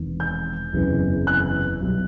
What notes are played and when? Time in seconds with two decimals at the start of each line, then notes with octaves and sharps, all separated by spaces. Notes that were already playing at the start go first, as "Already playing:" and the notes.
Already playing: E1 E2 C3 D#3
0.20 G6
0.73 F#1 E2 C3 E3
1.27 F#6
1.81 B1 B2 G3